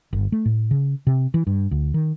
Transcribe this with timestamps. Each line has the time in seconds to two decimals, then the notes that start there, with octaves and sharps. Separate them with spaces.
0.13 G1
0.32 A3
0.45 A2
0.71 C#3
1.07 C3
1.34 E3
1.47 G2
1.71 D2
1.94 D#3